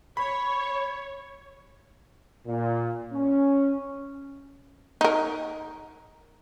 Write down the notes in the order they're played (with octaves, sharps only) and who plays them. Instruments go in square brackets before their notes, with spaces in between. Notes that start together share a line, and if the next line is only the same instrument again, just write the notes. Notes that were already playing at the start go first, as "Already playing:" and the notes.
[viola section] C#5 [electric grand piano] B5
[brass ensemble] A#2
C#4
[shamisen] D#4 A#4